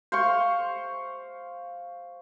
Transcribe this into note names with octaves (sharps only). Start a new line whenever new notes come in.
C5 F5 C6 C#6